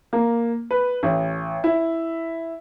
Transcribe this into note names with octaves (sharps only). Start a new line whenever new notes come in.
A#3
B4
A1
E4